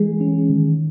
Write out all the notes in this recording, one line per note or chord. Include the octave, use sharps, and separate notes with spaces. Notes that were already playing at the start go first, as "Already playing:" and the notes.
Already playing: E3 G#3 G#4
C#4
D#3